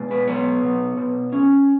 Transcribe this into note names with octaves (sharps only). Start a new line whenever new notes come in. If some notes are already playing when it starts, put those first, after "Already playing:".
Already playing: B2 G#3
B4
B3 C#5
B2
B2
C#4